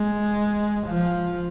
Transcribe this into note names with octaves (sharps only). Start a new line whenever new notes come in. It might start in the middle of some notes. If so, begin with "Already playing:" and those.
Already playing: G#3
F3